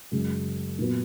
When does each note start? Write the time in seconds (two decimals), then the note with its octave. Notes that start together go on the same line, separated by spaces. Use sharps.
0.11 F#2 C#3 G#3
0.79 A#2 F#3 B3